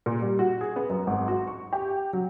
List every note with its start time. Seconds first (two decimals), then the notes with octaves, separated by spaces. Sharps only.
0.06 A#2
0.22 G3
0.39 F#4
0.61 G#4
0.76 B3
0.90 F#2
1.07 G#1
1.28 F#4
1.47 C#6
1.73 G4
2.13 F#3